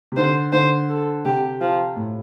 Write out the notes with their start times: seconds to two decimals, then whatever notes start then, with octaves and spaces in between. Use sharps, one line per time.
0.12 C3
0.17 D3 C5
0.53 D3 C5
0.89 A4
1.25 C3 G4
1.61 F3
1.96 A2